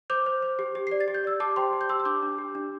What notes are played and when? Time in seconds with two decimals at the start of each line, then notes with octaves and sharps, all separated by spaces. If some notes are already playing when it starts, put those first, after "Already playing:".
0.10 C5 D6 G6
0.26 C5
0.42 C5
0.59 G4
0.75 G4
0.87 D5 C7
1.00 A6
1.08 G4
1.14 G6
1.24 D5 E6
1.40 G4 A5 D6
1.56 C5 G5 C6
1.73 G4
1.81 G6
1.89 G4 C6 E6
2.00 E6
2.05 D4 D6 G6
2.22 D4
2.38 G4
2.55 D4